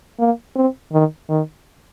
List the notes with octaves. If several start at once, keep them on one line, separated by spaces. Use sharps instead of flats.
A#3
C4
D#3
D#3